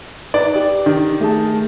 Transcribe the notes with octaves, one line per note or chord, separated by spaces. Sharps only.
D#4 B4 D5
G4
D#3
A3 G#4 A5